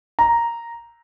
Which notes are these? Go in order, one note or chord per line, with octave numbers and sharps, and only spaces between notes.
A#5